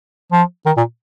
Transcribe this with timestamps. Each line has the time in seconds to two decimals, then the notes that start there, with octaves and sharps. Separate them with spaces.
0.32 F3
0.66 D#3
0.77 A#2